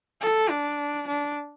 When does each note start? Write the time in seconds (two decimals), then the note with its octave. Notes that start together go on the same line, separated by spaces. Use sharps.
0.21 A4
0.50 D4
1.08 D4